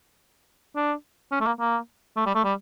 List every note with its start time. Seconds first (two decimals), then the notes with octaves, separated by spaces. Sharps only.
0.76 D4
1.31 C#4
1.40 A3
1.46 A#3
1.60 A#3
2.16 A3
2.26 G3
2.34 A3
2.44 G3